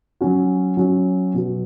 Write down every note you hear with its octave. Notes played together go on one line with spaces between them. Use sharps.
F#3 C#4 F#4
F#3 C#4 F#4
B2 F#3 B3 F#4